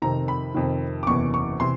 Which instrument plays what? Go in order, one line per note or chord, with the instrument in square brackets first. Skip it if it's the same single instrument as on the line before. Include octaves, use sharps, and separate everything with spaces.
[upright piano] F2 C3 D#3 A#5
B5
F2 C3 D#3
D6
F#1 E2 C3 E3 C#6
C#6
C3 E3 C6